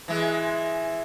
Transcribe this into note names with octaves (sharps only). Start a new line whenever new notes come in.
E3 G#3